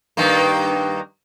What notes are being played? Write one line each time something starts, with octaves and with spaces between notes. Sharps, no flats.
G2 D#3 A#3